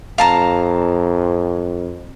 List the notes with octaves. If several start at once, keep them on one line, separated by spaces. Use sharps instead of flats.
F2 F5 A5 A#5